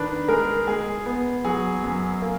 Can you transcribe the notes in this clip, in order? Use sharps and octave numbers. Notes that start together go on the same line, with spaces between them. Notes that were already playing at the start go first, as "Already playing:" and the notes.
Already playing: D#3 D4 B4
G#3 A#4
G#3 G#4
B3
F#3 G#4
F#2
A#3